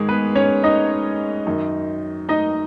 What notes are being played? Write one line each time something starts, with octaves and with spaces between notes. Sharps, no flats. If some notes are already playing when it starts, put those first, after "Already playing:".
Already playing: G#2 D#3 G#3 G#4
B3 B4
C#4 C#5
D#4 D#5
F#2 D#3
D#4 D#5